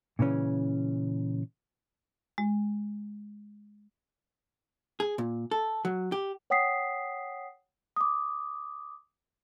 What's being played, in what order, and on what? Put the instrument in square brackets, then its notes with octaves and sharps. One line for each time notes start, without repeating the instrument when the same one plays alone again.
[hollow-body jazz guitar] A#2 C#3 E3 C#4
[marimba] G#3
[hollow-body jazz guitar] G#4
A#2
A4
F#3
G4
[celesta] C#5 F#5 G5 D#6 B6 C7
D6 D#6